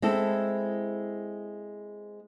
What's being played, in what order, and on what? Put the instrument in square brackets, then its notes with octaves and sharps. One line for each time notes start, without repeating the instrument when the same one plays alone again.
[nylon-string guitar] G#3 C4 E4 A4